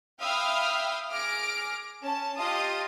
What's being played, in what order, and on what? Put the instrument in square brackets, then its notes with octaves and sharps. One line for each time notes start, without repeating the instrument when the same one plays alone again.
[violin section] E5 F5 G5 B5 D#6 F6
G#4 D6 F6 A#6 D7
C#4 A5
F4 G4 D#5 F5 A5 D#6